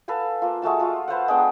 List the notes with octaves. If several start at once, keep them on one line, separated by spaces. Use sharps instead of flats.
A4 B4 F5 G#5
A#3 F4
G#3 A3 F#4 A5
F4 A4
B4 C5 F5 F#5
G#3 B3 D4 G5